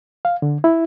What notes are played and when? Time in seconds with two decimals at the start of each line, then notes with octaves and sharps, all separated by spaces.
0.25 F5
0.42 D3
0.64 E4